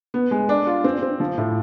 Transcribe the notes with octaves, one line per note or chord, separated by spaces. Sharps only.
B3
G#3
D4
F4
C4
C4
F3
A2